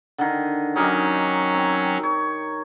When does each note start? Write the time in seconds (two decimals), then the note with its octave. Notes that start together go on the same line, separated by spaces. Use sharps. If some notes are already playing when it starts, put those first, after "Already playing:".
0.18 D3 D#3
0.75 F#3 C#4 D#4 G4 A#4
1.54 C4
2.03 C#5